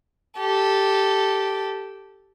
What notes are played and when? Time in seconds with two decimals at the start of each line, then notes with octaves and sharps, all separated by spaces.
0.39 G4 A4